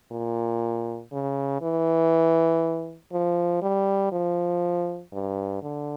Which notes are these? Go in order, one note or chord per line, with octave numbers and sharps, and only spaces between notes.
A#2
C#3
E3
F3
G3
F3
G2
D3